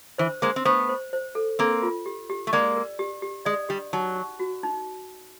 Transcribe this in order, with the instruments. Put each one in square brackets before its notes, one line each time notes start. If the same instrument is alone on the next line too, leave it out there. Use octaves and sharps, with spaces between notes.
[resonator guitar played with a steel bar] E3 [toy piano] C5
[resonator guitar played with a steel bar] G#3 A#3 [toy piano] C5
[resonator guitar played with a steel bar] C4
[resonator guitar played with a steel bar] A3 B3 [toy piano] C5
[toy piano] C5
C5
A4
[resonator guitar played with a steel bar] A#3 C4 [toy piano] A4
[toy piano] F4
G4
G4
[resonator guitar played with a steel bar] A3
[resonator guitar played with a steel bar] G#3 A#3 [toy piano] D5
[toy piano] A#4
G4
G4
[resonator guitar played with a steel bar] G#3 [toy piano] D5
[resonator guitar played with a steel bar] G3 [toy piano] G4
[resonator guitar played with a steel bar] F#3 [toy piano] D#4
[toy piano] D#4
F#4
D#4